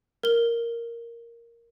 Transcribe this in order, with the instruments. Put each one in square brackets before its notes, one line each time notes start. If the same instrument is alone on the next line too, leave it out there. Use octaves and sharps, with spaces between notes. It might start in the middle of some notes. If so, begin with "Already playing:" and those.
[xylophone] A#4 G7